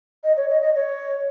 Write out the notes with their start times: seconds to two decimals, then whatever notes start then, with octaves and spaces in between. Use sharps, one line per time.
0.24 D#5
0.37 C#5
0.50 D#5
0.62 D#5
0.75 C#5